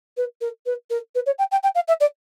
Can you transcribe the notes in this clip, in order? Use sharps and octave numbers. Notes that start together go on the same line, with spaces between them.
B4
A#4
B4
A#4
B4
C#5
G5
G5
G5
F5
E5
D5